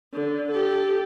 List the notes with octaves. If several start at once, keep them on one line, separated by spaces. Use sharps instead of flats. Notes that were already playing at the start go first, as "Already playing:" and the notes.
D3
G4 A4